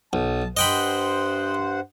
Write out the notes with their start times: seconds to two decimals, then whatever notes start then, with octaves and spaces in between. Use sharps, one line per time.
0.13 B1 A5
0.57 G2 C5 D#5 F#5 G5 B5